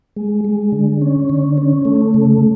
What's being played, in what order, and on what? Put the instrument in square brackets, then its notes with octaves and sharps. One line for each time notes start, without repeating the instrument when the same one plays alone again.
[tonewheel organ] G#3
G#3
D3
C#4
D3
C#4
A3
C#3